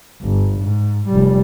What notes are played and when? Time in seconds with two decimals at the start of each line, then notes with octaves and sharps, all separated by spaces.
0.22 G1
0.62 G#2
1.08 F1 G3